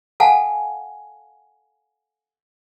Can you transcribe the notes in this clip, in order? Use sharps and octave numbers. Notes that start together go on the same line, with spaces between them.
A4 F5 F#5 G#5 A5